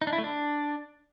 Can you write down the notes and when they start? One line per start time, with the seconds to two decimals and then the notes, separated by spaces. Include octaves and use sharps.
0.01 D#4
0.07 D4
0.13 E4
0.18 A3
0.24 D4